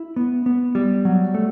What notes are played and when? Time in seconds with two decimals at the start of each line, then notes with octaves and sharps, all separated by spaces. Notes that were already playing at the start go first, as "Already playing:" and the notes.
Already playing: E4
0.16 B3
0.46 B3
0.75 G3
1.05 F#3
1.34 A3